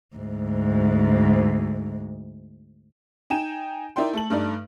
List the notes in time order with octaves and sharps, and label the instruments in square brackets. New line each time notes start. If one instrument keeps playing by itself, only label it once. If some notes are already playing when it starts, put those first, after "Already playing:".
[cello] D2 G#2
[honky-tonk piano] D#4 G5 G#5 E7
D#4 E4 A#4 D5 G5 C6
A3 A4 F#7
G2 A3 D#4 D5